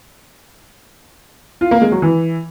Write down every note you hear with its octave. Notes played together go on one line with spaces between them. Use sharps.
F4
A#3
G#3
F#3
E3